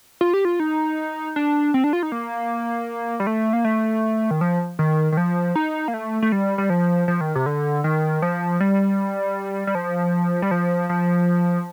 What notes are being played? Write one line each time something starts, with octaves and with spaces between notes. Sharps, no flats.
F4
G4
F4
D#4
D4
C4
D4
F4
D#4
A#3
G3
A3
A#3
A3
D#3
F3
D#3
D#3
F3
D#4
A#3
A3
A3
G3
G3
F3
F3
D#3
C3
D3
D#3
F3
G3
G3
F3
G3
F3
F3